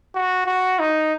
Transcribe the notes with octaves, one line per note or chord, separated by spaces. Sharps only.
F#4
F#4
D#4